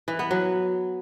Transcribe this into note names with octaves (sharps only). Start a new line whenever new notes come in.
E3
B3
F#3